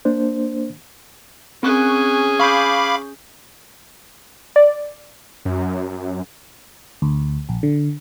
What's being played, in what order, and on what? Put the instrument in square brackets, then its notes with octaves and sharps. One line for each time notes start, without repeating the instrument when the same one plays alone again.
[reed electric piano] A#3 D4 C5
[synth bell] C4 C#6 F#6 [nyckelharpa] C#4 G#4
[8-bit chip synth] F5 B5 D6 [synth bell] C#6 G6
[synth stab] D5
[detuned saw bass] F#2
[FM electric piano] D2
A#1
D3